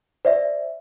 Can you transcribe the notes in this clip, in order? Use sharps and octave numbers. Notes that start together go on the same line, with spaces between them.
C5 D5 E5